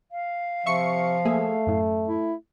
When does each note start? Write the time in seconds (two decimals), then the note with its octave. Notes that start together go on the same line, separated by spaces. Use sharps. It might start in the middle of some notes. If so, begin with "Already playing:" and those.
0.11 F5
0.66 C3 F3 E5 C#6 C#7
1.25 A3 A#3 G#4 E5
1.67 F#2 A2
2.08 E4